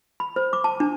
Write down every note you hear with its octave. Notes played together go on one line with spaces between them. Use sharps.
B5
C5
D6
A5
D4